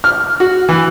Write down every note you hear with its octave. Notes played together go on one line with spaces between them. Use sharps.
F6
F#4
E3